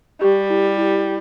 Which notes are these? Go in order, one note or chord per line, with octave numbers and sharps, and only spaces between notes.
G3 G4
E4
E4